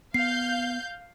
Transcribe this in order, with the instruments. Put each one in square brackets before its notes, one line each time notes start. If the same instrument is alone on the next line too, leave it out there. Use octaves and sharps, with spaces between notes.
[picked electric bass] B3 [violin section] F5 G6 [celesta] C7